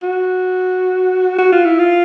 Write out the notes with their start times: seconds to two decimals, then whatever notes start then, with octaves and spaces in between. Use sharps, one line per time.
0.03 F#4
1.38 F#4
1.52 F4
1.65 E4
1.79 F4